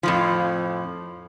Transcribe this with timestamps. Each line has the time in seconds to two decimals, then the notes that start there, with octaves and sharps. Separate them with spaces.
0.03 F2 A2 F3